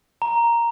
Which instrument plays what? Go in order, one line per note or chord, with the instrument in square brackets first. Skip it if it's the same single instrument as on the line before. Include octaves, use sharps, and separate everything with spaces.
[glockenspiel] A#5